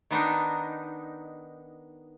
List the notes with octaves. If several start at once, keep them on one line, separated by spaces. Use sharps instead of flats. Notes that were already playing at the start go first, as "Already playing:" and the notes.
D#3 B3 D4 D#4